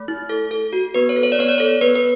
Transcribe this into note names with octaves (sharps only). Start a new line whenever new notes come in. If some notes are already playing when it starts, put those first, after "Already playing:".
Already playing: A3
E4
A4
A4
F#4
B3 B4
C#5
A4
C#5
D5
B3 C#5
D5
A4 C#5
B3 B4
B4